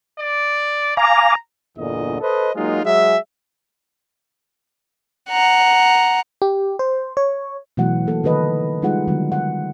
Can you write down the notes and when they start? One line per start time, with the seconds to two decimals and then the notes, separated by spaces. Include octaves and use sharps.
0.19 D5
0.97 F5 G#5 A#5 D6
1.77 G1 E2 A#2 D3 D#5
2.20 A4 B4 C5 D#5
2.55 F#3 G#3 A#3 D#4 F4
2.84 F#3 G#3 G#4 E5
5.30 F#5 A#5
6.42 G4
6.79 C5
7.17 C#5
7.77 B2 E3 F#3 A3 F#5
8.07 B2 A#3 A4
8.23 D3 D#3 A3 A4 B4 D#5
8.82 G3 G#3 D#4 F4 G#4 F#5
9.08 D3 D#3 F#3 G#3 B3
9.32 F#5